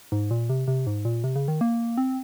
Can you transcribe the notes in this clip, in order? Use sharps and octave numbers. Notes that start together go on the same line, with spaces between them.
G#2
A#2
C3
C3
G#2
A#2
C3
C#3
D#3
A#3
C4